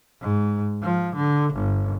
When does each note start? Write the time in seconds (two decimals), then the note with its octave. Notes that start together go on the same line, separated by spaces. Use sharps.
0.21 G#2
0.83 F3
1.16 D3
1.54 G1